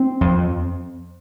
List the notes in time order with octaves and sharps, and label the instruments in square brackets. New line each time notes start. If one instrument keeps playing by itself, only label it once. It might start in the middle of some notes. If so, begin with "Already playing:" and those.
Already playing: [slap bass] C4
F2